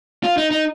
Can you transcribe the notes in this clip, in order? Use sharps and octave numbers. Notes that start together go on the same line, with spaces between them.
F4
D#4
D#4